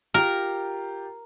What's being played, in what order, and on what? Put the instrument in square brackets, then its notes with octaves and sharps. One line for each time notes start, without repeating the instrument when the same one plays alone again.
[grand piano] F4 G4 [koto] A#4